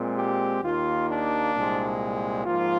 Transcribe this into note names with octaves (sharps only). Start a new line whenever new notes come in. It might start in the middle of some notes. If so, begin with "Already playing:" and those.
Already playing: A#2 G#3 C4
G4
D#2 D#3 A#3 F4
D4
C2 A#2 G#3 C4
G#2 F3 A#3 F4